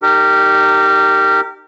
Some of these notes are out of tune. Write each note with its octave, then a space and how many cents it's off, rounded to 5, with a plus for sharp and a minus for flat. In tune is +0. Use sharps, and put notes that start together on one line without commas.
D#4 -25 G4 -10 A#4 -25